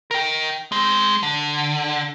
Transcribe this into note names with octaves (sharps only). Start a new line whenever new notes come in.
A#4 G5
G#3 C4
D3